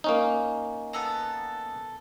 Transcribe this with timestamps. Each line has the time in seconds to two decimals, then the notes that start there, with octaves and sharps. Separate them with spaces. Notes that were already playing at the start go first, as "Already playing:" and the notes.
0.04 A#3 C#4 D#4
0.93 B3 A4 A#5